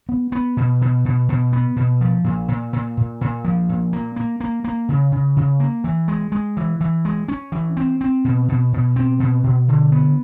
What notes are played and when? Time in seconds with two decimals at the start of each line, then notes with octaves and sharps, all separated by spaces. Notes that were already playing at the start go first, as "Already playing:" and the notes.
0.09 B3
0.32 B3
0.57 B2
0.81 B2
1.05 B2
1.29 B2
1.53 B3
1.76 B2
2.01 F3
2.24 A#2
2.48 A#2
2.73 A#2
2.97 A#2
3.21 A#2
3.45 F3
3.69 A#2
3.93 A#3
4.16 A#3
4.40 A#3
4.64 A#3
4.89 C#3
5.12 C#3
5.37 C#3
5.60 A#3
5.84 E3
6.08 G#3
6.32 G#3
6.57 E3
6.81 E3
7.05 G#3
7.28 C#4
7.52 E3
7.77 C4
8.01 C4
8.25 B2
8.48 B2
8.73 B2
8.96 C4
9.20 B2
9.44 B2
9.68 D3
9.92 B3